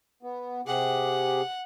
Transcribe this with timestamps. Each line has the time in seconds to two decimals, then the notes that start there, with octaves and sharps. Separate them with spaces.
0.23 B3
0.67 C3 G4 G#4 F#5